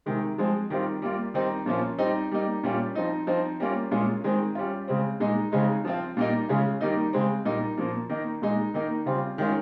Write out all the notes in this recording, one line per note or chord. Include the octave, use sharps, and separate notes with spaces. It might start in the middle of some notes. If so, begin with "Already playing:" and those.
C3 D#3 G#3
F3 G#3 C4
D#3 G3 C4 F4
G3 A#3 F4
D#3 G3 C4 D#4
A#2 F3 A#3 C#4 F4
G3 C4 D#4
G3 A#3 D#4
A#2 G3 C#4 F4
F3 C4 D#4
F3 C4 D#4
G3 A#3 C#4 F4
A#2 G#3 C#4 F4
D#3 G#3 C4
G3 C#4 F4
C#3 G#3 C4
A#2 G#3 D#4
C#3 G#3 C4 D#4
F3 C4 F4
A#2 G3 A#3 D#4
C#3 G#3 C#4 F4
D#3 G3 A#3 D#4
C#3 G#3 C4
A#2 G3 A#3 D#4
A#2 F3 A#3
D#3 A#3 D#4
A#2 G#3 D#4
D#3 A#3 D#4
C#3 G3 C4 F4
D#3 G#3 C#4 F4